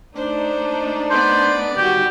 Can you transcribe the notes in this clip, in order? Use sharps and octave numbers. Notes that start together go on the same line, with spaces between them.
A3 D4 D#4 C5
B3 C5 D5
D#3 G3 F#4 G4